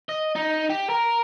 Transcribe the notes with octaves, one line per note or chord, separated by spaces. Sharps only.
D#5
D#4
G4
A#4